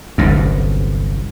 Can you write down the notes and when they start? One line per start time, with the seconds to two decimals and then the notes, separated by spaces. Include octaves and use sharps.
0.18 G1 C2 F#2